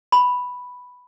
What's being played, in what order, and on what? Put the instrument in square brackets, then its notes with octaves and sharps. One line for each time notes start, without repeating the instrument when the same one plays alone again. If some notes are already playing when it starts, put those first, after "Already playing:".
[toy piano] B5